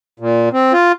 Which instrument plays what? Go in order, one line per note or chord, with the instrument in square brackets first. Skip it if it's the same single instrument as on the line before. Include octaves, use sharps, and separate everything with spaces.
[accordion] A#2
C4
F4